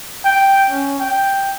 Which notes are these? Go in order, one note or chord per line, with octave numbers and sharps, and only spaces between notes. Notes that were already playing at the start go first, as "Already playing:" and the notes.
G5
C#4
G5